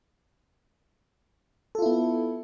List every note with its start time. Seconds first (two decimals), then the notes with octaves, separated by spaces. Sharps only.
1.75 A4
1.79 F4
1.82 E4
1.86 B3